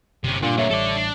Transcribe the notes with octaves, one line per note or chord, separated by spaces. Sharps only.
G1 C3 C#4
G2 A#2 D3 D4
A#2 D3 C#5 E5
A1 G3 A4 D5
D4